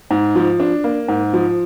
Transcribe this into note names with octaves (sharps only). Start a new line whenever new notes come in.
G#2
F3
D4
A#3
G#2
F3